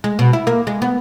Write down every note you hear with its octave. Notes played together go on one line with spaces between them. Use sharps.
G#3
B2
E4
A#3
G#3
B3